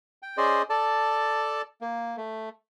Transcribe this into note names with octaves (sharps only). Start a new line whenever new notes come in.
G5
C#4 G#4 C5 D5 D#5
A4 D5 A5
A#3
A3